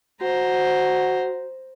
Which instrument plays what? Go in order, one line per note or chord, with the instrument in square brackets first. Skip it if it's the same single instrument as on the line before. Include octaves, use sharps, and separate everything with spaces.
[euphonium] F#4 [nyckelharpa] C5 A#5